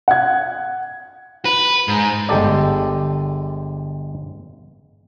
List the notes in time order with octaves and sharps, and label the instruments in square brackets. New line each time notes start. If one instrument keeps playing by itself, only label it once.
[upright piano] F#5 G#6
[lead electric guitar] B4
G#2
[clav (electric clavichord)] G1 G#3 G4 A4 D5